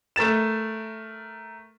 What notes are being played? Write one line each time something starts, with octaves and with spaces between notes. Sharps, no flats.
A3 A#4 A6 E7